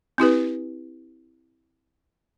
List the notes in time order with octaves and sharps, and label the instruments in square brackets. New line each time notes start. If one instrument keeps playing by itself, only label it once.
[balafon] C4 E4 G4 B4